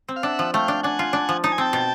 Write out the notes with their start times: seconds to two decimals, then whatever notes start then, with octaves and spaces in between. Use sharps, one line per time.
0.08 C4
0.16 F5
0.23 D4 E5 F#5
0.39 F3
0.54 A3 F5 G5
0.68 D4
0.83 D4 F#5 G#5
0.99 F4
1.13 D4
1.29 F3
1.44 D#4 A5
1.52 G#5
1.58 C4 G5 A5
1.73 B2